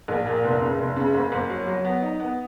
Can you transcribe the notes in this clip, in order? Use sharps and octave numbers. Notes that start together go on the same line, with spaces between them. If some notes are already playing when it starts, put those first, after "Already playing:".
A#1
A#2
F1
C#3
F1
C#3
F#1
F#1
F#3
F#3
B3
D#4
B3